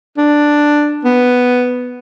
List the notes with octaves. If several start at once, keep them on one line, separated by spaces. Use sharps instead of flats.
D4
B3